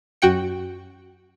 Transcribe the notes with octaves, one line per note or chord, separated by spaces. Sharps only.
F#2 F#4 F#5 G5 C#7